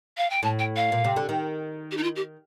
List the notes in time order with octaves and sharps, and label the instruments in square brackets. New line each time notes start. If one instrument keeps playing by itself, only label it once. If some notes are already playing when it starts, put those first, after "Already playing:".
[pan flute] F5
G5
[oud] A2 [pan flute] A5
[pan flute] G5
F5
[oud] A#2
C3
D3
D#3
[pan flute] G4
D#4
F4
G4